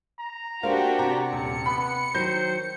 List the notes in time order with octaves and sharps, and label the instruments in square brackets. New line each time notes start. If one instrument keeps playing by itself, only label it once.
[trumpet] A#5
[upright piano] A#3 [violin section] D4 F#4 G4 [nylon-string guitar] A#4 C5 F5
[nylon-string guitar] C3 [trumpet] D5 [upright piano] A#5
[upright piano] D#1 [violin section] C#7
[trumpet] B3 [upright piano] B5
[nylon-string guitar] D#3 F#3 [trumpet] C5 [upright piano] G6